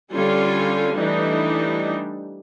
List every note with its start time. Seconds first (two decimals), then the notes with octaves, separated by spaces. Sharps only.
0.13 D3 G3 C#4 F4 A4 G#5
0.96 E3 G3 A3 D4 D#4